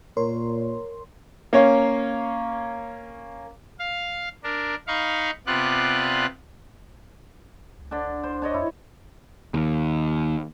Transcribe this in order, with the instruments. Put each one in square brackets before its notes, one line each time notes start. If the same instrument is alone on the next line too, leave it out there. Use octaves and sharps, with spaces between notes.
[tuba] A#2 [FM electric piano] A#4 C#5 C6
[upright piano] A#3 C#4 C#5 F5
[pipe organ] F5
D4 A#4
D#4 F5 B5 C#6
C3 B3 F4 D5 F#6
[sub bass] C#2
[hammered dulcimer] D3 D4
C5
D4 C#5 D#5
[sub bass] F2 [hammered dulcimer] E4
[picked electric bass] D#2